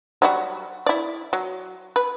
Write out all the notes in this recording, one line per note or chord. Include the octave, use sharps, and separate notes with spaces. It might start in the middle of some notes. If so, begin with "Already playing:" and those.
F#3 G3 F#4
E4 D5
F#3
B4